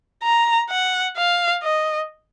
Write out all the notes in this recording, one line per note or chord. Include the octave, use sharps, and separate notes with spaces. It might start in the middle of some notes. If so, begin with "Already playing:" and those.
A#5
F#5
F5
D#5